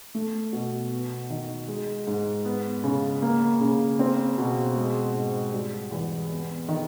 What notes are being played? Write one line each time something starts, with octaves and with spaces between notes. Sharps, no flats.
A3
B2
B3
D#3
G#3
G#2
B3
C#3
A#3
C#3
C4
B2
G#3
G#2
G3
E2
B3
D#3